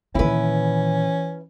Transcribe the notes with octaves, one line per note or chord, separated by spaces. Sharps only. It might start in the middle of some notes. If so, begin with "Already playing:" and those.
A#2 D#3 E3 C#4 E4 B4